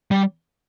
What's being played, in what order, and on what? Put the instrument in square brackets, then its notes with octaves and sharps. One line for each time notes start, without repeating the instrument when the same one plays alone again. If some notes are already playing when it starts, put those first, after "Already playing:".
[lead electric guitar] G3